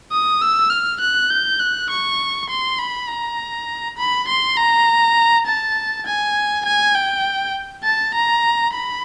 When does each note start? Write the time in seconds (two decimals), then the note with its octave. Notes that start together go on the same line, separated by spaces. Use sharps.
0.12 D#6
0.42 E6
0.70 F6
1.01 F#6
1.30 G6
1.60 F#6
1.90 C#6
2.50 C6
2.79 B5
3.09 A#5
3.98 B5
4.28 C6
4.57 A#5
5.47 A5
6.06 G#5
6.66 G#5
6.95 G5
7.84 A5
8.14 A#5
8.73 B5